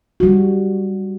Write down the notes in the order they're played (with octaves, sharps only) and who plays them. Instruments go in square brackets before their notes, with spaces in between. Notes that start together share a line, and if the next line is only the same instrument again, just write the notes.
[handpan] G3 F#4